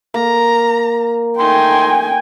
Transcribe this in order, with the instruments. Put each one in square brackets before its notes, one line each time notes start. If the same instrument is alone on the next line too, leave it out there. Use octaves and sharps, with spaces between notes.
[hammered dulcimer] A#3 [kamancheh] A#5
[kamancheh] A3 D#4 [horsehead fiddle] G5 G#5 [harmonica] C6